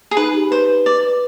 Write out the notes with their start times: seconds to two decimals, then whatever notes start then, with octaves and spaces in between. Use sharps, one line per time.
0.11 G#4
0.17 D#4 B4
0.34 G4
0.51 B4 C5
0.69 B4
0.86 B4 D5
1.03 B4